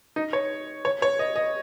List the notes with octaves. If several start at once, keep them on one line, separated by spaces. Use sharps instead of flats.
D#4
C#5
C#5
C#5
D#5
D#5